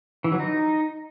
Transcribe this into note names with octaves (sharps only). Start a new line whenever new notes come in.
E3
F#3
D#4